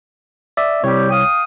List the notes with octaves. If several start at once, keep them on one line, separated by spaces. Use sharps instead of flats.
D5 E5
C2 G3 C4 G4 C#5
F5 G5 D#6